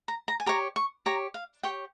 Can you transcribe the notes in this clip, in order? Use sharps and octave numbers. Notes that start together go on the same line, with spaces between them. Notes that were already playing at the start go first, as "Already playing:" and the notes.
A#5
A#5
G#5
G4 C#5 A#5
C#6
G4 C#5 A#5
F5
G4 C#5 G5